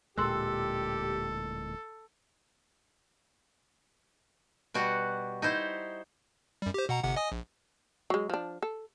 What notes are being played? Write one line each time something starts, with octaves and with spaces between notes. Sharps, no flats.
D1 A#2 G#3 G4 A4 C6 E6 F#6
B2 G3 F#4 F#5
D#4 E4 C5
F#2 G3
G4 C5
B2 F#5 A#5
G1 C3 F#5
D#5 G#5 D#6
A#1
F#3 G#3
F3 D4
A4